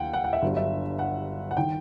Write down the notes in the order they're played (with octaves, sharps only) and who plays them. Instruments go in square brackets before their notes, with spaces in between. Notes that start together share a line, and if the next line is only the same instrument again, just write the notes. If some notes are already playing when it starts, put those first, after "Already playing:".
Already playing: [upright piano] D#2 F#5 G5
F#5
F#5
E5
G1 G2 F#3
E5
F#5
F#5
D#3 G5